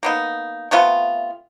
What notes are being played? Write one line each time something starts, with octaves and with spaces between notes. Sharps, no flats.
A#3 B3 D#4
C3 A3 B3 F4